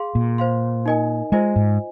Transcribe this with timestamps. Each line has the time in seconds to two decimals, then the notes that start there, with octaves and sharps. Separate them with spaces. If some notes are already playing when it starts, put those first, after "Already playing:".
Already playing: G#4 F5 C6
0.15 A#2
0.38 C5 F5 C6
0.86 D#4 A#4 D#5 G#5
1.32 G#3 F4 C5 D#5 G#5
1.56 G#2